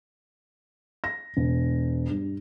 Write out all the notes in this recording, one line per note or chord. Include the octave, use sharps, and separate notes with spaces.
A#6
E1
G2